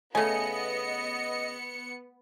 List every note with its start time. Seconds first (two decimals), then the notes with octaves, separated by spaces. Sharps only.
0.15 C#3 A3 B3 D#5 G#5 C#7